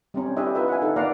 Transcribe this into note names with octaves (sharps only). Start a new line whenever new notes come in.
G3 C4 C#4
D4 E4 G4 C#5 D#5 E5
E4 F4 A#4 B4 D#5 E5
F#5 G#5
D#4 A4
A#3 D5 F5 F#5 A#5